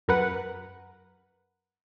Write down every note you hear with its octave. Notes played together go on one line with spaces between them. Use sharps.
F#2 A#4 B4 F#5